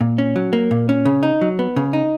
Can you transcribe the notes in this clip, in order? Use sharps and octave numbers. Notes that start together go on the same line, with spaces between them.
A#2
C#4
F#3
A#3
A#2
C#4
C#3
D#4
F#3
B3
C#3
D#4